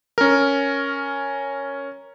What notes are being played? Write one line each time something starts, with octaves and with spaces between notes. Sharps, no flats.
C#4 A#4